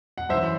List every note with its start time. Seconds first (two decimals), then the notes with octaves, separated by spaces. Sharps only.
0.18 F#5
0.29 F#2 C5 E5
0.33 E3